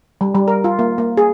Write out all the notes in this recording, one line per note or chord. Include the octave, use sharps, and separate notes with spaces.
G3
G3
A#4
F4
A#3
A#3
G#4